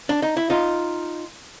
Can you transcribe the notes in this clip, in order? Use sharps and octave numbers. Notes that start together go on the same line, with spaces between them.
D4
D#4
E4
D#4 F4